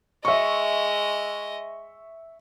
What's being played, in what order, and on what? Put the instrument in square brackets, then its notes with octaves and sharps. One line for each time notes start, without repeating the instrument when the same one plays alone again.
[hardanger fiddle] G#3 D#5 [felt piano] E5 C#6